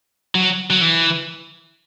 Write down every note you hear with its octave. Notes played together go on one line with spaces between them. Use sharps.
F#3
F#3
E3